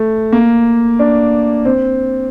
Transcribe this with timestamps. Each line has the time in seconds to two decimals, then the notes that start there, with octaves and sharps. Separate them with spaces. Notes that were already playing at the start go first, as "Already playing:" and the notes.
Already playing: A3
0.33 A#3
0.99 D4
1.65 C4